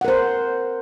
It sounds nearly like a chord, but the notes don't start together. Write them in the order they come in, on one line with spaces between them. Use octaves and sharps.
F#5 A#4 C5